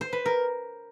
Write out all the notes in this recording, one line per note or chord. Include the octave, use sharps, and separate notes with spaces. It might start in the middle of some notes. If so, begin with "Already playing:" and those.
C5
B4
A#4